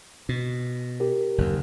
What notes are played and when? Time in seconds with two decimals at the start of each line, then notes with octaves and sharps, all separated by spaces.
0.29 B2
1.00 G4 A#4
1.38 F#1 D#2